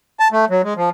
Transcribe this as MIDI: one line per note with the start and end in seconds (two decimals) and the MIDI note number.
0.20 0.28 81
0.32 0.45 57
0.50 0.62 54
0.64 0.74 56
0.77 0.90 53